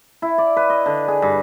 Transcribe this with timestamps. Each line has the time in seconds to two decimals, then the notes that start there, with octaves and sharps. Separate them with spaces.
0.22 E4
0.38 D5
0.57 B4
0.70 D#5
0.86 D3
1.08 G#4
1.22 G2